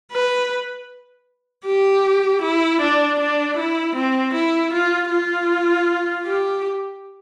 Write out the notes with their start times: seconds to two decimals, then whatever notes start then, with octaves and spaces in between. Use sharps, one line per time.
0.12 B4
1.65 G4
2.42 E4
2.81 D4
3.19 D4
3.57 E4
3.95 C4
4.34 E4
4.73 F4
5.10 F4
6.25 G4